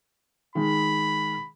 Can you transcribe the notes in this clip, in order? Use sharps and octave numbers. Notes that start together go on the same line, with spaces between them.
D#3 G#3 B5